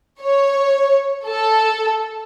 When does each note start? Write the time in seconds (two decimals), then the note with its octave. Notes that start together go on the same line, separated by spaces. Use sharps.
0.21 C#5
1.26 A4